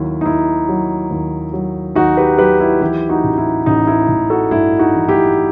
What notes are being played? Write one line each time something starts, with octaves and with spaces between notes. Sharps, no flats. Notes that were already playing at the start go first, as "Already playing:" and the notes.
Already playing: D#2 F#3 E4
D#4
D#2 E4
F#3
D#2
F#3
D#2 D#4 F#4
G4 B4
F#3 G4 B4
E4 G4
E3 E4 G4
D#4 F#4
A1
E4
A1 D#4
E4
A1
F#4 A4
G2 E4
D#4 F#4
E3
E4 G4